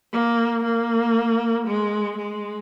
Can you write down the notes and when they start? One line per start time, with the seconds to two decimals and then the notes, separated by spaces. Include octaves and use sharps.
0.13 A#3
0.64 A#3
1.67 G#3
2.17 G#3